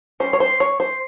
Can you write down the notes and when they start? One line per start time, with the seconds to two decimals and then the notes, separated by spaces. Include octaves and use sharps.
0.20 G3 C#4 C5
0.33 C#5
0.40 C5
0.60 C#5
0.80 C5